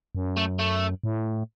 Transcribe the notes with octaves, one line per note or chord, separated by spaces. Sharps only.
F#2
A3
A3
A2